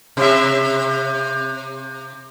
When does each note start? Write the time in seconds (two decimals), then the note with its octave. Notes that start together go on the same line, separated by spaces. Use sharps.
0.17 C3 E5